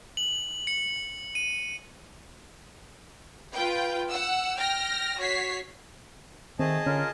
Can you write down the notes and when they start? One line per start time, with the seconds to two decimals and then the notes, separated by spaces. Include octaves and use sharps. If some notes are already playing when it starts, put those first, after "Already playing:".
0.17 F#7
0.67 C#7
1.35 D#7
3.53 F4 B4 G5
4.10 F#5 E6
4.57 G5 F6 A#6
5.17 F#4 C#5 B6 C7
6.59 D#3 A3 C4 G#4 D#5 A5
6.86 D3 C#4 F4 A#4